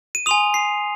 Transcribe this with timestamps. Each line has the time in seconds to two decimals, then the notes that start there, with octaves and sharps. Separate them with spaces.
0.15 D#7
0.26 G#5 C6 D#6 F7
0.54 C7